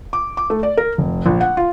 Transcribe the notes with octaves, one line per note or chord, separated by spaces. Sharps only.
D6
D6
A3
D5
A#4
F1
A#1
F#5
F4